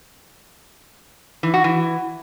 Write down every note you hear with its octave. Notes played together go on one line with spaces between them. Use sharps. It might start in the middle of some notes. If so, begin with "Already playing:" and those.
E3
F#4
E3